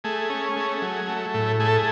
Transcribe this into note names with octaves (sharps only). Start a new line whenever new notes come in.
A3 G#4
C#4
A3
F#3
A3
A2
A3 G#4
A4
G#4